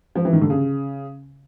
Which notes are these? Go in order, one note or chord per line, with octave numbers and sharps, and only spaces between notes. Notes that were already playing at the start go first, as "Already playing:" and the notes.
F3
E3
D#3
D3
C#3